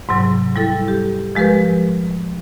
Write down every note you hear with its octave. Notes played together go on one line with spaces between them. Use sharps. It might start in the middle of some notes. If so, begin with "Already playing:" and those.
G#2 C3 F#3
G3 E4 A4
G4
F3 G#3 G4 A#4 B4